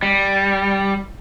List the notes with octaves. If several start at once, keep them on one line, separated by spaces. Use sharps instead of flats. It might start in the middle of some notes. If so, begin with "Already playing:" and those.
G3